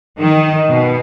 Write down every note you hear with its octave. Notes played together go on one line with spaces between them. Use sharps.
D#3
B2